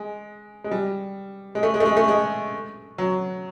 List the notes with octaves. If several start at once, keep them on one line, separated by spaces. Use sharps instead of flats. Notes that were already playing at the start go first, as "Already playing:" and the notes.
Already playing: G#3
G#3
G3
G#3
A3
G#3
A3
G#3
A3
G#3
F#3